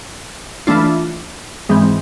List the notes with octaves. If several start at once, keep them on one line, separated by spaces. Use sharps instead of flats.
E3 A3 D4 F4
G#2 E3 G#3 C4